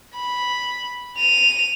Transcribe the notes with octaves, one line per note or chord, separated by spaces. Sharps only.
B5
D#7 F7